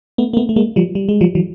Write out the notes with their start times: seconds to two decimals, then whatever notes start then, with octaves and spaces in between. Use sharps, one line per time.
0.18 A3 B3
0.33 A#3
0.37 A3 B3
0.49 A3
0.56 G#3 A#3
0.76 F3 G3
0.95 G3
1.09 G#3
1.21 F3 G3
1.35 E3 F#3